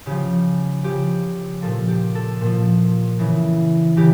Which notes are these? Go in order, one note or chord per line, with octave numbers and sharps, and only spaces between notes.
C#3 F3 G4
C#3 F3 G4
A#2 F3 A4
G4
A4
A#2 F3
C#3 E3
C#3 E3 G4